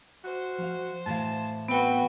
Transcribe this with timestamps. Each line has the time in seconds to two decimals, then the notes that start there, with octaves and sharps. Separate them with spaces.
0.24 F#4 C5
0.58 F3 F5
1.06 A2 E3 F5 A5
1.68 B3 C4 F#4 B4 G5